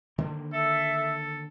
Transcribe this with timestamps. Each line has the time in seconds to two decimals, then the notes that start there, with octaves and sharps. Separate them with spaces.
0.18 D3 D#3 A#3
0.53 A4 E5
0.98 A4